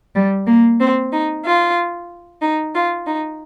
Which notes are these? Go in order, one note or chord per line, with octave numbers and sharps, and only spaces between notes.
G3
A#3
C4
D#4
F4
D#4
F4
D#4